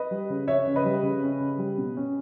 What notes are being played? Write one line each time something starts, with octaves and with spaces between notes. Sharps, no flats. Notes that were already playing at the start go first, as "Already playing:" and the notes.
Already playing: B4 D#5
G3
C#3
C#4 C#5 E5
C#3
B4 D#5
G3
C#3
C#4
C#3
G3
B2
C#4